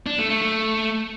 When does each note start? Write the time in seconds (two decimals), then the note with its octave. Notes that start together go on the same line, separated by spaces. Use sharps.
0.06 D4
0.18 A3
0.30 A3
0.42 A3